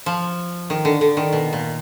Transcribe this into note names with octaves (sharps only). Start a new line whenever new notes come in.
F3
D#3
D3
D3
D#3
B2
A#2